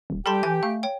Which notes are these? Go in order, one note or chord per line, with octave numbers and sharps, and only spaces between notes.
D#1
G3 G4 A4 G5 A5 C6
E3 G#5 G6
A3 F5
C#5 G5